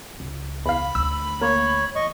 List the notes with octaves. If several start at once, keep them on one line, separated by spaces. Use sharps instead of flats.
C#2
E2 F5 B5
D2 E6
A#3 C#5
E3 D#5 C#6